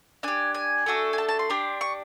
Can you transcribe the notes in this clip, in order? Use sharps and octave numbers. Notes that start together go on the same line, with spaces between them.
D4 G4 G#5
G#5
A3 D4 F#4 A4
G#5
A5
A5
C6
D4 G4
C#6